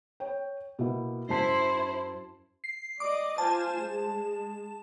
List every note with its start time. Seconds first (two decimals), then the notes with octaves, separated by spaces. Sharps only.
0.20 C#5 G5
0.79 B2 A#3 E4
1.30 F#2 E4 C5 A5 C7
2.64 C7
3.00 D5 D#5 D6
3.38 F4 C5 G#5 A5
3.81 G#3